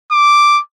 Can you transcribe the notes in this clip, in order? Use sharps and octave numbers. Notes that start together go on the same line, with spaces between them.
D6